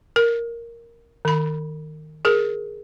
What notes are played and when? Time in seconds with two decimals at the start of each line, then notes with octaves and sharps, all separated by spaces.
0.16 A#4
1.25 D#3 B5
2.25 G#4 A#4